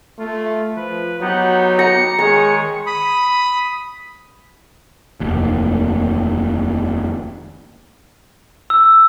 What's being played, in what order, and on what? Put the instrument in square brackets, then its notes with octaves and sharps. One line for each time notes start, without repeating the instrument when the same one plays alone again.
[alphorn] A3 [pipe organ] F4
[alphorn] F3 [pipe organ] B4
[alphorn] F#3 [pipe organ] B3 D#4 G4 [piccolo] F#5
[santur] A#5 [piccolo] C#7
[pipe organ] D#3 G#3 C#5 [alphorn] G#4 [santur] A#5
[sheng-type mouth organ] B5 D#6
[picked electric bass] F1 D#2
[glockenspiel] E6